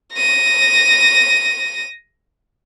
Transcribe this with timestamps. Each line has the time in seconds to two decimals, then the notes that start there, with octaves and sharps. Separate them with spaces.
0.15 A#6 D#7